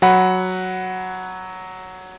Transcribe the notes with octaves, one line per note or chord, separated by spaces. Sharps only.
F#3 F#5 B5